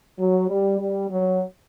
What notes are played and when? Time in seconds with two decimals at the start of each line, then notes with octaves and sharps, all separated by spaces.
0.19 F#3
0.48 G3
0.79 G3
1.09 F#3